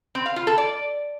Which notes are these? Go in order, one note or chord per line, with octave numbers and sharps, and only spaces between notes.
C4
F5
F4
A4
D5